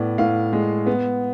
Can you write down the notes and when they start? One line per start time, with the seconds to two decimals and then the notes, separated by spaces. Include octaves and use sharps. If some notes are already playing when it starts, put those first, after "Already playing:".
Already playing: A2 B3 D5
0.18 A2 F5
0.53 G#3
0.87 B3